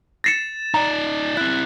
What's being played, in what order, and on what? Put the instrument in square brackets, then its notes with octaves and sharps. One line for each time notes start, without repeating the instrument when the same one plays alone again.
[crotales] A6 E7 [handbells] A#6 C7 C#7
[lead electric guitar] D#4 D5 [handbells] A#5
[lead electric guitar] C4 E4 [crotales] F#6